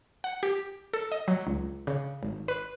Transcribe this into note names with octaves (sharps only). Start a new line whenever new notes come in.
F#5
G4
A4
D#5
F#3
C#2
C#3
G#1
B4